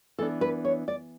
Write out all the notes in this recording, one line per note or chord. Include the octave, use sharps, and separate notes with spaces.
E3 B3 D4 A4
B4
C#5
D5